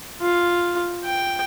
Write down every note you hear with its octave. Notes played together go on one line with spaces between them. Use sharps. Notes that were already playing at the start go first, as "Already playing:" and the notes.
F4
G5